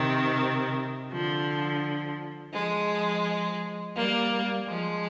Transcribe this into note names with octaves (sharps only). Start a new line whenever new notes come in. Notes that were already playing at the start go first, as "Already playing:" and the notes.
Already playing: C3 D#3
D3 F3
F3 G#3
G3 A#3
F3 G#3